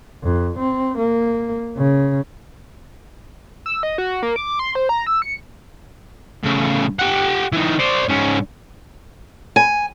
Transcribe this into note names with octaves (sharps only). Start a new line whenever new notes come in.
F2
C4
A#3
C#3
E6
D#5
F#4
A#3
D6
C6
C5
A#5
E6
C#7
A2 C#3
G4 F#5
E3 D#4
C5 D5
G#2 C#4
G#5